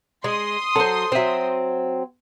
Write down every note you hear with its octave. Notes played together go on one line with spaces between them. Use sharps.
G#3 C6 D#6
F#3 A4 C5
F#3 C4 C5 E5